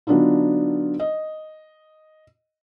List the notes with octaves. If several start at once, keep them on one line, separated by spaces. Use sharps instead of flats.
D3 F#3 B3 D4 D#4 F4
D#5